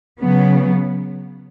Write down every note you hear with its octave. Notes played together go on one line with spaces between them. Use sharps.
C#3 F#3 B3